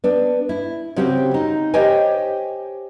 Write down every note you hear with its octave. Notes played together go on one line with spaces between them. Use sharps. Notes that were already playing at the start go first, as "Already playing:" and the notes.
B3 D4
E4
C#3 C4 F#4 G4 C5 G5
D#4
G4 C5 C#5 D#5 G5 G#5